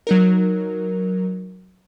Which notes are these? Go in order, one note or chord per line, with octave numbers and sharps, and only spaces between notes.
F#3 D#4 A#4